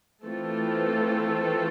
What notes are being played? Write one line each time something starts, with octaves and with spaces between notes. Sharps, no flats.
E3 A3 C4 F4 A4